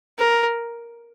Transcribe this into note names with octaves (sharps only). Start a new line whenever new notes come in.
A#4